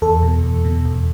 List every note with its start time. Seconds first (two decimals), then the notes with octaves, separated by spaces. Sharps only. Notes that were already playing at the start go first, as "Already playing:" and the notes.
0.02 E2 A4
0.22 B2
0.43 E2
0.65 B2
0.85 E2